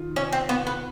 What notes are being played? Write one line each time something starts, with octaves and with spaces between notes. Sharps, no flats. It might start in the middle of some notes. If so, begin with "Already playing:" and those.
Already playing: D#3 F4
C#4
C4
B3
B3